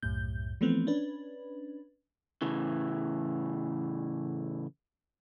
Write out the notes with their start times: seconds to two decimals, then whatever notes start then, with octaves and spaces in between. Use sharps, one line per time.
0.03 C2 F#2 A2 G6
0.61 E3 F3 A3 B3 C4
0.87 C#4 D4 B4
2.42 A2 C#3 E3